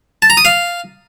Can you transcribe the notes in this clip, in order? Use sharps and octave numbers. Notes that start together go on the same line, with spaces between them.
A5
A#5
D#6
F5